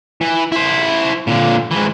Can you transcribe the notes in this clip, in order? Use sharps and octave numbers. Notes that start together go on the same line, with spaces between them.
E3
E4 C5
A#2 D3
G#2 E3